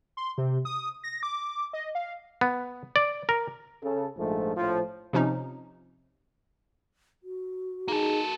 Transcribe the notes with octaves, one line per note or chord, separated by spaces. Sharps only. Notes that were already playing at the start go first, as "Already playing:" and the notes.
C6
C3
D#6
A#6
D6
D#5
F5
B3
D5
A#4
C#3 A4
A#1 G#2 F3 A3
A#1 A2 F3
C3 F3 C#4 D#4
F#4
A#3 D#4 G#4 A4